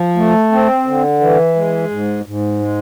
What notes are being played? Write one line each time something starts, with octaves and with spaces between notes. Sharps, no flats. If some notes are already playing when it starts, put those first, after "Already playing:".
Already playing: F3
A3
C4
D3
E3
G#3
G#2
G#2
G#3